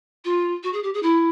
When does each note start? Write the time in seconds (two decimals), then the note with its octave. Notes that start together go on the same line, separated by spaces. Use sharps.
0.25 F4
0.63 F#4
0.73 G#4
0.83 G4
0.94 G#4
1.03 E4